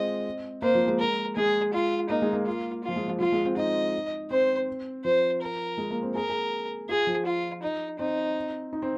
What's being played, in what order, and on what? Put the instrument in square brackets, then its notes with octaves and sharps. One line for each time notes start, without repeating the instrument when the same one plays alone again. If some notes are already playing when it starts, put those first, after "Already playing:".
Already playing: [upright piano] G#3 C4 F4 [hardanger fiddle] D#5
[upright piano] A#3 [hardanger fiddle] C5
[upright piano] F3
G#3
[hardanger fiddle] A#4
[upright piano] G#3 [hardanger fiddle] G#4
[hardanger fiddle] F4
[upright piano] A#3 [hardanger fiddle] D#4
[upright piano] G#3
A#3
[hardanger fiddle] F4
F4
[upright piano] F3
G#3
F3
[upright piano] F3 [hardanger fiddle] F4
[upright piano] G#3
C4
[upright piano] D#4 [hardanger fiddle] D#5
[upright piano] C4 [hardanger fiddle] C5
[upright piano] F3 [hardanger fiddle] C5
[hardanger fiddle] A#4
[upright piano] G#3
A#3
C4
[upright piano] G#4 [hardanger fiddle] A#4
[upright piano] G#4
[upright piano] F4 [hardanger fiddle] G#4
[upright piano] F3
[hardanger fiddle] F4
D#4
[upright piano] C4 [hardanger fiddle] D#4
[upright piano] D#4
C4